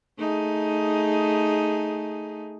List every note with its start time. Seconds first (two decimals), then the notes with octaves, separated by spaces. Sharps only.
0.18 A3 D#4 G#4